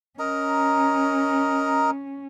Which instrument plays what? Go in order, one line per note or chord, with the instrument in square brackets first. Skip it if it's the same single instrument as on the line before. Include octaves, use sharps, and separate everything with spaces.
[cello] C#4 [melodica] A#4 D#5 A#5